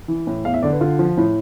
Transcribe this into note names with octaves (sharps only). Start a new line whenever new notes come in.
E3
A2
E2 F5
E5
D3 D5
B4
D3 F4
F3
A2